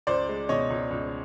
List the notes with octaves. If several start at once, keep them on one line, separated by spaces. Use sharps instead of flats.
C#2 C5 D5
G#3
B2 C#5 D#5
C#2
C#2